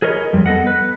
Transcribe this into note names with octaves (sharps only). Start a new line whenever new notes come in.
G#4 A#4 B4 C#5 D#5
F2 G3
B3 A4 D#5 F#5
B4